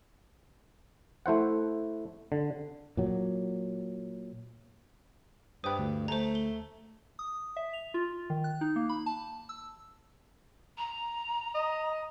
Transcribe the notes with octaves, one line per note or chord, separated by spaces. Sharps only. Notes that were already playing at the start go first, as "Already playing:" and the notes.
A3 E4 C5 F#5
D3
A#2 F#3
G2 B4 C5 G5 D#6
D2
A3 C5 A#5
G7
D#6
E5
F7
F4
D#3
F#6
D#4
A#3
B5
A5
E6
A#5
D#5